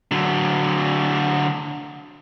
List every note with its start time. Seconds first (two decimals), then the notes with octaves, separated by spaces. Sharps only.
0.11 D3 F#3